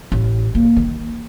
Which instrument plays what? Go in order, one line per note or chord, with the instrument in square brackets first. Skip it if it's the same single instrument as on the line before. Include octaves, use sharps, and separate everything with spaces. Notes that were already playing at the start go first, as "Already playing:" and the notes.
[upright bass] A1
A#3
D#3